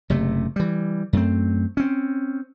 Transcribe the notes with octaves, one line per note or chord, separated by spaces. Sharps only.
F#1 C3 A3
E3 G3
F#2 A3 C4
C4 C#4